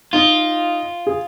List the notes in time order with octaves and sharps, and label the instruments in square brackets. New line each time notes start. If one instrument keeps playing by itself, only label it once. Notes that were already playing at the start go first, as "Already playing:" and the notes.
[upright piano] D#4 [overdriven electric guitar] F4
[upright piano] G#4